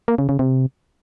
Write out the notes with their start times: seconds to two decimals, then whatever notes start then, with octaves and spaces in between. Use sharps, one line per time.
0.08 A#3
0.18 C#3
0.29 C#3
0.39 C3